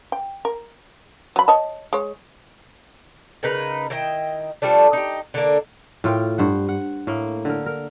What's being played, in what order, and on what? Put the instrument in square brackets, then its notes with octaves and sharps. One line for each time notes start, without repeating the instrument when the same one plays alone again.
[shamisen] G5
A#4
F#3 B5
C#5 D#5 A5
G#3 C#5
[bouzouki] C#3 D#4 A#4 B4
D#3 E4 D#5 G5
F3 G3 A3 D4
D#4 G4
D3 A#3
[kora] A2 F4 A#4 G5
G2 C5 F#5
F#5
A2 A#3
D3 A#4
A#4